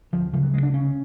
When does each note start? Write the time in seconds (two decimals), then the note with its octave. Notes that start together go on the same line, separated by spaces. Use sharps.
0.13 D2 F3
0.33 C#3 F3
0.43 F#3
0.53 D2 G#3
0.63 D4
0.73 C#3 C#4